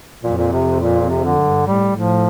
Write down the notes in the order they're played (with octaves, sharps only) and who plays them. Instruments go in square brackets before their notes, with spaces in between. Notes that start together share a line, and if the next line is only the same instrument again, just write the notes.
[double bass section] F2 [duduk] A#2
[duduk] A#2
C3
A#2
C3
D3
[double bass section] G2
[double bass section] A2 [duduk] G3
[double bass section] A2 [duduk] F3